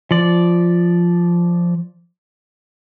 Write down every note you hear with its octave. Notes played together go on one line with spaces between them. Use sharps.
F3 D5